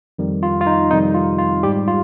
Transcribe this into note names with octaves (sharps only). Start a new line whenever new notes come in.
F2 D#3 G3
F4
F4
D#4
F2 C3 D#3 G3 D#4
F4
F4
G#2 G3 G4
F4